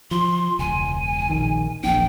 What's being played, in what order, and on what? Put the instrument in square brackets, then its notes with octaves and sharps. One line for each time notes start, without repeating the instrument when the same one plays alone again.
[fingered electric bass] F3 [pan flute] C6
[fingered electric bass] E1 C#2 [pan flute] G#5
[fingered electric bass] A#1 D#3
[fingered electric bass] E1 A#1 D4 [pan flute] G5